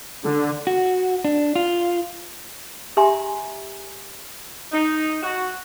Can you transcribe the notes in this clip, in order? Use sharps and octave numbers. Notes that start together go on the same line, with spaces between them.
D3
F#4
D4
F4
G4 E5 G#5 A#5 C6
D#4
F#4